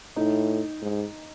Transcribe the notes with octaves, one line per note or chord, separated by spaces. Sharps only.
A2 D#4
G#2